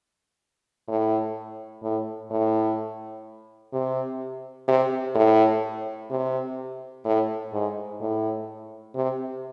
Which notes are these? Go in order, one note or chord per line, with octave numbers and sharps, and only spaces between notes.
A2
A2
A2
C3
C3
A2
C3
A2
G#2
A2
C3